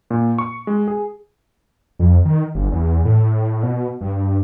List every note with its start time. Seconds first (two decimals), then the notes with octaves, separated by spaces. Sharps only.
0.10 A#2
0.38 C#6
0.67 G#3
0.88 G#4
1.99 F2
2.25 D#3
2.55 G1
2.71 E2
3.05 A2
3.63 B2
4.01 G2